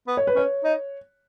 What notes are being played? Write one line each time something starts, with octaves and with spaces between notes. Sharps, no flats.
B3
C#5
B4
C#4 C#5
D#4